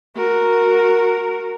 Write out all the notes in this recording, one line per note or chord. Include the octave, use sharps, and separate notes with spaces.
F#4 A#4